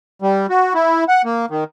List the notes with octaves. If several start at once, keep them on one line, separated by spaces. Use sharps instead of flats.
G3
F#4
E4
F#5
A#3
D#3